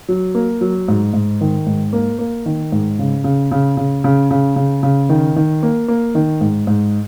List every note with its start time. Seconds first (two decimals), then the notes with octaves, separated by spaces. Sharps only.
0.08 F#3
0.35 A#3
0.61 F#3
0.88 G#2
1.13 G#2
1.41 D#3
1.66 G#2
1.93 A#3
2.19 A#3
2.46 D#3
2.72 G#2
2.99 C#3
3.24 C#3
3.51 C#3
3.77 C#3
4.04 C#3
4.31 C#3
4.56 C#3
4.83 C#3
5.09 D#3
5.36 D#3
5.63 A#3
5.88 A#3
6.15 D#3
6.41 G#2
6.67 G#2